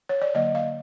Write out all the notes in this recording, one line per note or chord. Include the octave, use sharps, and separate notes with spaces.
C#5
D5
D3 F#3 A#3 D#5
F5